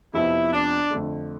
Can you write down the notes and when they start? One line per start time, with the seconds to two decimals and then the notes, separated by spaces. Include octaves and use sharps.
0.14 F2 C3 F3 B3 E4
0.53 D4
0.90 F2 D3 A3